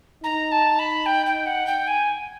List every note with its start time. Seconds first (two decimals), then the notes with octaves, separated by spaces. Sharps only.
0.23 D#4 A#5
0.51 A5
0.79 B5
1.05 G5
1.26 G5
1.46 F#5
1.66 G5
1.87 G#5